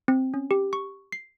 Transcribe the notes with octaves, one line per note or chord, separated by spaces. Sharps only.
C4
C#4
G4
C#6
C7